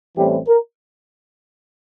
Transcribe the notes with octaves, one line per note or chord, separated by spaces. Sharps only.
A1 A2 E3 G3 C4 G4
A#4